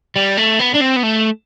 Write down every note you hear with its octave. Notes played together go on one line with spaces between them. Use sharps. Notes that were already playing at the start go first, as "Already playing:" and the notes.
G3
A3
B3
D4
C4
B3
A3